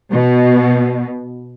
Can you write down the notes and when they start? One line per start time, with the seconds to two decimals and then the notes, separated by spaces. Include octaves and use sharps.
0.12 B2